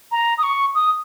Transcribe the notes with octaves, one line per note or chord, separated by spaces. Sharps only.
A#5
D#6
C#6
D#6